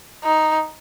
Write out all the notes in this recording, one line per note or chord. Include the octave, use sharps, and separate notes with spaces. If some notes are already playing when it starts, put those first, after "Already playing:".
D#4